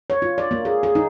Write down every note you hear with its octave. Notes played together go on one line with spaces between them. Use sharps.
C#5
F4
D5
A#3
G#4
G#4
D#4